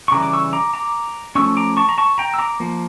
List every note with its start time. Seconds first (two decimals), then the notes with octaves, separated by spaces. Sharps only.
0.08 C#6
0.12 C#3 E3 G3 A#5 D6
0.23 D6
0.33 C#6 E6
0.53 A#5 D6
0.74 A#5 D6
1.35 F3 A3 C#4 C#6 E6
1.57 A#5 D6
1.77 A5 C#6
1.89 A#5
1.98 A5 C#6
2.18 G5 A#5
2.34 E6
2.38 A#5 D6
2.60 F3 A#3